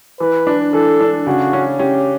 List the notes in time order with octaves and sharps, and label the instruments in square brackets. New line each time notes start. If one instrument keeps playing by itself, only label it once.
[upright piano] E3 [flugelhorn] B4
[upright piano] D4
[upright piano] E3 [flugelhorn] A4
[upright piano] D4
[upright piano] C#3 [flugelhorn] F#4
[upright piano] C#4
[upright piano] C#4 [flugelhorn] G4